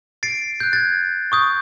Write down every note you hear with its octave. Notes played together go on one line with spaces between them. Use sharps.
A6 C7 D7
F#6 G6
G#6 A6
C#6 D#6 G6